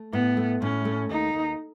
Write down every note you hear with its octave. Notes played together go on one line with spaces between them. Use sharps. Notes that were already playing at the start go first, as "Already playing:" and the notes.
Already playing: A3
A2 B3
A3
A2 C#4
A3
D#2 D#4
D#2